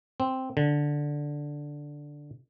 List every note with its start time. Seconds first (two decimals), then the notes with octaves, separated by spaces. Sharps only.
0.20 C4
0.57 D3